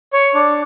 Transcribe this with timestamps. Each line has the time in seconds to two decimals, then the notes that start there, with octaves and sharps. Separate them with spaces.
0.13 C#5
0.34 D4